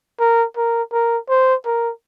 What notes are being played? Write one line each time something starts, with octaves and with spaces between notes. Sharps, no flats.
A#4
A#4
A#4
C5
A#4